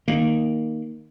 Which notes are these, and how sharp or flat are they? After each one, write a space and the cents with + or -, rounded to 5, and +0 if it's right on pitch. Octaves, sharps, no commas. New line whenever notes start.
D#3 +0 A#3 +0